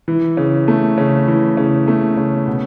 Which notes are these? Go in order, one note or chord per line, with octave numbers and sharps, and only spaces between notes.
E3
C#3
A3
C#3
E3
C#3
A3
C#3
B2